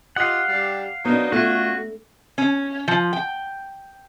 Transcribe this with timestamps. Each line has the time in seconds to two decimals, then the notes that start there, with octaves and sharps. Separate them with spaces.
0.16 F4 G4 D#5 F5 F#5
0.49 G3 D4 G4
1.05 F#3 A#3 B3 D4 D#4
1.32 A3 C#4 D4 F4 F#4
2.38 C#4
2.88 F3
3.13 G5